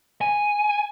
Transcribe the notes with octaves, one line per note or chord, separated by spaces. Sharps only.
G#5